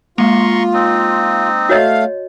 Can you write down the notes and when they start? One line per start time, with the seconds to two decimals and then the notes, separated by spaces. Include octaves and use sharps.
0.18 G#3 A#3 F4 A#5 C6 C#6
0.74 C4 D#4
1.69 A3 F#4 C#5 D#5 F5